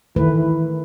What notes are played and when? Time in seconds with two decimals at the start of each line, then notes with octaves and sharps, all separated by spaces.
0.16 D#3 E3 A3 B4